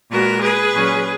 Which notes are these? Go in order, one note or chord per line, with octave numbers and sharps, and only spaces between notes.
A#2 G#3 B3 F#4 A#4
G#4 B4
A#2 F#3 C#4